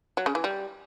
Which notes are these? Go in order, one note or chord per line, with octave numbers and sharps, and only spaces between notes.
F#3
C#3
E3
G3